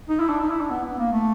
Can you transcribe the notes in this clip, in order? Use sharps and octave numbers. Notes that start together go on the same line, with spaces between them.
D#4
E4
D4
D#4
E4
D4
B3
B3
A#3
A3